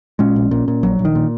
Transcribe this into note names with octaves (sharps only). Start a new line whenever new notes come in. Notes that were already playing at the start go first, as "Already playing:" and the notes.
A#2 G#3 C#4
A#1
A#2
A#2
A#1 F#3
A#1
D#3
A#2